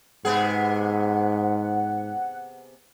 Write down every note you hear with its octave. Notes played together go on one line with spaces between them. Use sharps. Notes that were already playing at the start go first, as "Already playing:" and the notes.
G#2 C3 B3 G#4 F#5